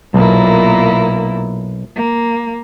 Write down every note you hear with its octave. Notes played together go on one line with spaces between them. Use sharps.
B1 A#2 A#3 E4
A#3